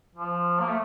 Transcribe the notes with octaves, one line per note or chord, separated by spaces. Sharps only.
F3
A#3
A3